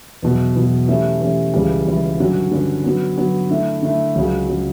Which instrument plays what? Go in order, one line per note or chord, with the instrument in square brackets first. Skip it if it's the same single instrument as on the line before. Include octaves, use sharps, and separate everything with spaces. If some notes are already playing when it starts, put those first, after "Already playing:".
[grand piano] E2 B2 F#3
E2 B2 F#3
E3 A3 C#4 G4
E3 A3 C#4 G4
C#2 C#3 E3 G3
C#2 C#3 E3 G3
G2 D3 F#3 C#4
G2 D3 F#3 C#4
D3 F#3 B3
D3 F#3 B3
D3 A3 E4
D3 A3 E4
C#2 C#3 F#3
C#3 F#3